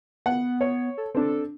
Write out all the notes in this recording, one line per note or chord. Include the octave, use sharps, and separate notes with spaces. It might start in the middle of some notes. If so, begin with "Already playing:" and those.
B3 F#5
C#5
A4
C4 D4 A4